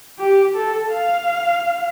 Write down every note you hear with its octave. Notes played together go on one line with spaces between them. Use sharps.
G4
A4
F5